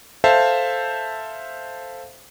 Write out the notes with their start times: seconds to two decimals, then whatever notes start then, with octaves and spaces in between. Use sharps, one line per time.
0.24 A4 C5 E5 F5 A5